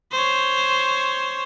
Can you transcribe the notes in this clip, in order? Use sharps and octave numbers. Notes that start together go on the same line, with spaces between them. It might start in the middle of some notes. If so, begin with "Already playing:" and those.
C5 C#5